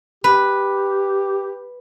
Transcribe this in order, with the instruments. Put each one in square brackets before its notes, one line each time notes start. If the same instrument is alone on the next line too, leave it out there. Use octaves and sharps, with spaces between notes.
[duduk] G4 [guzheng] B4